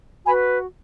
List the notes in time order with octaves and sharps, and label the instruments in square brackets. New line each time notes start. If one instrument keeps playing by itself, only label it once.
[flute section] F#4 B4 G#5 B5